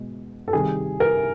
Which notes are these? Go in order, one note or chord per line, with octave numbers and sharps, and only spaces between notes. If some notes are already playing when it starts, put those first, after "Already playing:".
Already playing: B2 G#3
A4
C3 D#3 G3 G#4
A#4